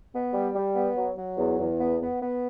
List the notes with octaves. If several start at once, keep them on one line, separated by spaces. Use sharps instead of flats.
B3
G3
G3
B3
F#3
F#3
E2
E2
B3
B3
B3